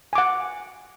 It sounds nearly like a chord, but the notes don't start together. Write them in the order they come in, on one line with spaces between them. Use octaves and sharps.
G#5 D6 F#5